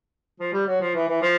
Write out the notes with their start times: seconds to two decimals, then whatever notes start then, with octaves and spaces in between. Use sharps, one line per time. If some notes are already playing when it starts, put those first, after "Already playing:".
0.40 F3
0.53 G3
0.67 F#3
0.80 F3
0.94 E3
1.08 E3
1.22 F3